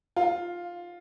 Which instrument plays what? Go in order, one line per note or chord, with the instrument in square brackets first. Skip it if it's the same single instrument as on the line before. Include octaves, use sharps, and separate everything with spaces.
[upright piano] F4